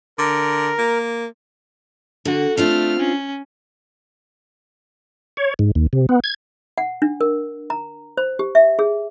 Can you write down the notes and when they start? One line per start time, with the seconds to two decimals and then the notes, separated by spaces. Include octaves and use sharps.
0.19 D3 A#4
0.78 A#3
2.25 D3 F#4
2.57 A3 C4 D4 F4 F6
3.00 C#4
5.37 C#5
5.59 G#2
5.75 D#2
5.93 C3
6.09 B3
6.24 G#6
6.78 F#5
7.02 D4
7.21 A#4
7.70 A#5
8.17 C5
8.39 G4
8.55 E5
8.79 G#4